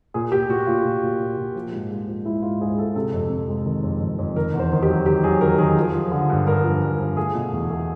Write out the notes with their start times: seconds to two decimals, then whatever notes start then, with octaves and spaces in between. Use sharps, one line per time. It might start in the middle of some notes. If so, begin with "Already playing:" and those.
0.14 A#2 G#4
0.32 A#2 G4
0.49 A#2 F#4
0.67 A#2 F4
0.85 A#2
1.03 A#2
1.20 A#2
1.37 A#2
1.55 F3
1.72 G#2
1.91 G#3
2.07 F3
2.25 G#3 E4
2.42 G#2 F4
2.61 G#2 G#4
2.78 G#2 A4
2.95 C3 A4
3.13 F2
3.30 C3
3.48 G#3
3.66 D#3
3.84 F2
4.00 F2
4.19 F2
4.36 D#3 A#4
4.53 E2
4.59 C5
4.72 D#3
4.83 G4
4.89 F#3
5.06 D#3 G4
5.24 F#3 G#4
5.41 D#3 A#4
5.58 D#3 G#4
5.77 F3
5.94 F3
6.11 D3
6.30 G2
6.47 G2 A#4
6.64 F3
6.82 G2
6.99 F3
7.16 A3 G#4
7.35 B2
7.53 E2
7.70 A3